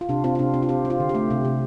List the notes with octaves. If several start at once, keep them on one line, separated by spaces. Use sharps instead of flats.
F4
C3 D4
C4 F4
F4
C3 D4
C4 D4
F4
C4 G4
C4
F4
D3
G4
A3
C3
C3